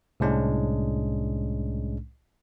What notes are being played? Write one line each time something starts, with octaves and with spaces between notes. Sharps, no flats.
C2 A2 G#3 C#4 D4